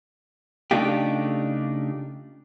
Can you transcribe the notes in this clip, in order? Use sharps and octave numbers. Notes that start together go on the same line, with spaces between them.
C#3 A3 D4 D#4 F4 G4